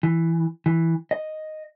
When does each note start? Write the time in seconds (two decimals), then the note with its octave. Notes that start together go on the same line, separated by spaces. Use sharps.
0.03 E3
0.66 E3
1.11 D#5